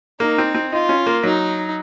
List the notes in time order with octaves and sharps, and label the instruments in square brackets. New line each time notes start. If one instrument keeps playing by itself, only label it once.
[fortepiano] A#3 [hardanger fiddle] D#4
[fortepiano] C4
C4
[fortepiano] D#4 [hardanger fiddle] F4
[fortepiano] C#4
A#3
[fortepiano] F#3 [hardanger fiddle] D#4